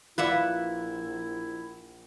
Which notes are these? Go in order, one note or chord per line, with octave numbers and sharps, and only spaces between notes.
A#1 E4 F4 B4 D5 E5 F#5